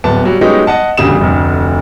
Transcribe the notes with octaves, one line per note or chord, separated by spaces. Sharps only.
D1 B3 A5
F#3 G3
F#3 G#3 B3 C#4 D#4 G4
D#5 F#5 A5
E1 D2 C#3 G3 D#6 E7
F1 D2